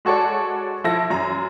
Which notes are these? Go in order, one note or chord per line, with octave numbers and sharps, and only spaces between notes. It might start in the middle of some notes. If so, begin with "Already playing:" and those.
G#3 F#4 A4 C#5 D5
F3 E4 A4 A#6
F#2 A#5